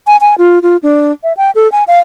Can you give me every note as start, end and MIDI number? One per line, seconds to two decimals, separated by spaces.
0.07 0.17 80
0.21 0.35 80
0.38 0.59 65
0.63 0.77 65
0.83 1.12 62
1.23 1.33 76
1.37 1.51 79
1.55 1.70 69
1.72 1.84 80
1.88 1.99 77